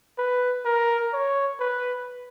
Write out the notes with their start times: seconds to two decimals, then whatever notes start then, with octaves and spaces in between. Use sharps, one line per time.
0.18 B4
0.65 A#4
1.13 C#5
1.60 B4